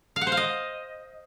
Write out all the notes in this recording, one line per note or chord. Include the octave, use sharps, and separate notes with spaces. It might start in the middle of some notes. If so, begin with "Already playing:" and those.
F5
F#5
C5
F5
D#5